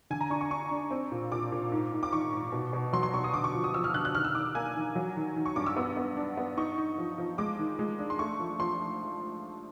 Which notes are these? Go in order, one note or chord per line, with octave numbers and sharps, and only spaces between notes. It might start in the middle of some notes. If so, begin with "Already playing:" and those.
D3 G#5
A#5
D4 C#6
C#6
D4 C#6
D4
C4
A#2
A#2 D6
A#2
G#2
G#2
D6
D#3 C#6
G#2
B2
B2
F#3 C6
C6
B2 C#6
D#6
D3 D6
C#6
F3
D#6
F3 E6
F6
D3 F#6
F#6
D#3 F6
E6
D#3 D6
A#3 G#5
D#3
F#3
D#3
D#3
C#6
G2 D6
E6
B3
B3
D4
B3
D#4 C#6
D#4
F3
F3
G#3 D6
D#3
G#3
D4
C6
A3 C#6
F3
F3 C6